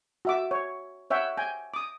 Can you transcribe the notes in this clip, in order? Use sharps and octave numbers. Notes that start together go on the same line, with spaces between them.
F#4 E5 D6
C#5
C#5 E5 F#5 G5
G5 G#5
D6 D#6